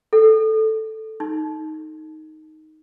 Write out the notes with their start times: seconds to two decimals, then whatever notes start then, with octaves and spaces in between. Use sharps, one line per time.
0.13 A4
1.20 D#4